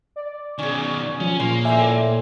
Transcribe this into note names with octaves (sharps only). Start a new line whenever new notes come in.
D5
B2 D#3 C#4 G#4
F3 C#4
A#2 A#3 C6
A2 D5 E5 G5 G#5